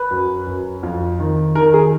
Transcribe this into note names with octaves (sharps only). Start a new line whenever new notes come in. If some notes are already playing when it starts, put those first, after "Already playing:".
Already playing: B4
F#2
F#2
F2
D#3
D#3 A#4
G#4